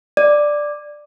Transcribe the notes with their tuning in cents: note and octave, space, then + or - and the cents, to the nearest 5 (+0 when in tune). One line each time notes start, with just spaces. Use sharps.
D5 +5